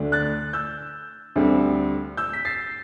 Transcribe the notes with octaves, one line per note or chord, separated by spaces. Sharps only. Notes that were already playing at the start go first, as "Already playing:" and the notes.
Already playing: D2 D3 A3 D4
F#6 A6
E6 G6
D2 D3 G3 C4
E6 G6
B6
A6 C7